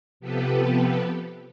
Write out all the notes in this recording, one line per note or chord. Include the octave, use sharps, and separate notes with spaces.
C3 F3 B3 G4 A4 B4